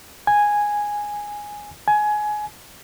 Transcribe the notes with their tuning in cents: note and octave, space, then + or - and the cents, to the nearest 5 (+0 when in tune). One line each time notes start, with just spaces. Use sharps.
G#5 -5
G#5 +20